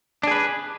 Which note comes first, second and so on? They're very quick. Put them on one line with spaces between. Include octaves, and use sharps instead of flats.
D4 G#4 B4